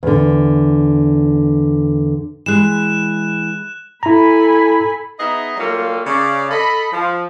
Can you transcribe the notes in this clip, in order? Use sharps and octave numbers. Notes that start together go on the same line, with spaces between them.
E2 D3
E3 G#3 F#6 E7
E4 A4 G#5 A#5 B5
B3 D#4 G#4 D#5 E5 A#5
F#3 G3 A3 A#3 F4
C#3 D5
A4 D#5 B5
F3